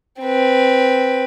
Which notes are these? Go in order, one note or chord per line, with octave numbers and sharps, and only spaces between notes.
C4 B4